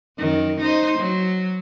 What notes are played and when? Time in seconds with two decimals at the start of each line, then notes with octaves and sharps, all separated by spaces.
0.18 F#2 D#3
0.61 D#4 C5
0.99 F#3